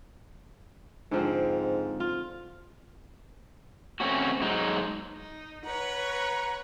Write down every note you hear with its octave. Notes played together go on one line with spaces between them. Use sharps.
G#2 D3 F3 C4
F4
A3 C4 C#4 F#4
F#3 G#3 D#4
D#4
B4 C#5 F#5 A#5